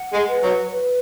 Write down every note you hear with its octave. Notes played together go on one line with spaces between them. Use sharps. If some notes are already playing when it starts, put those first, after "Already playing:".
Already playing: F#5
G#3
B4
F#3
B4